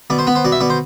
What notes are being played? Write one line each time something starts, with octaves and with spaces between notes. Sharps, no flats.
B2 D5
C5
B3 B4
C5
B2 D5
E5
B2 D5
C5